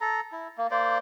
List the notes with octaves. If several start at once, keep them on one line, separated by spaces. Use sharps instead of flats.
A4 A#5
E4
A#3
A#3 C5 D5